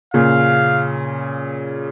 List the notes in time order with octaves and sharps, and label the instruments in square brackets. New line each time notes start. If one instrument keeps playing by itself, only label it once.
[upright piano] A#2 C#3 [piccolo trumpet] F5